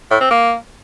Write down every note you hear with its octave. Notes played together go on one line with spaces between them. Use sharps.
A2
C4
A#3